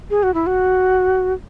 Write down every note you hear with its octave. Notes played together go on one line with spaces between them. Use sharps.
G#4
F#4
E4
F#4